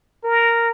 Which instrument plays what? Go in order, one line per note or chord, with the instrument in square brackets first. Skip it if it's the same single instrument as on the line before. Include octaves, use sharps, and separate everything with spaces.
[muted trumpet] A#4